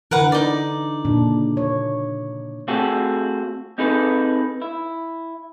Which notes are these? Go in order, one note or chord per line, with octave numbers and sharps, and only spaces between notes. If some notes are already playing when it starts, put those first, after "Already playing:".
D3 E3 A#4 B4 F#5
D#4 D5
A#2 C#3 D4
C#5
A3 C4 F4 F#4 G#4 A4
C4 D#4 G#4 A4 B4
E4